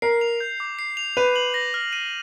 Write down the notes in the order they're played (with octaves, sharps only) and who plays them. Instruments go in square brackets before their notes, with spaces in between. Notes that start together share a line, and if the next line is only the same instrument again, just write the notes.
[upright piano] A#4 [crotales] C7
[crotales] F7
G6
D6
C7
F7
[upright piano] B4 [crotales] D#7
[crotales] F#7
A#6
F6
D#7